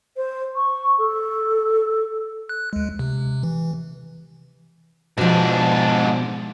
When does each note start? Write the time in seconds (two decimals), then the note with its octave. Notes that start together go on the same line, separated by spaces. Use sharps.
0.17 C5
0.56 C#6
0.98 A4
2.49 F#6
2.73 D2 G#3
2.99 C3
3.43 E3
5.18 G#2 B2 F3 D4